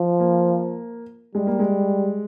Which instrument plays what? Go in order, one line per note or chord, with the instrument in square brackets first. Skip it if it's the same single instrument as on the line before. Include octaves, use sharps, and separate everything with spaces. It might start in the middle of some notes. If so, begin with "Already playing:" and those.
Already playing: [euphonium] F3
[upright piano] A#3
[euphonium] G3 [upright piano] G#3
[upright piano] A#3
G#3